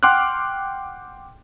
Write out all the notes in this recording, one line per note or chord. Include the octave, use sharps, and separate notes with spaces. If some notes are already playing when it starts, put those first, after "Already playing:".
F#5 G5 C6 D6 F6 F#6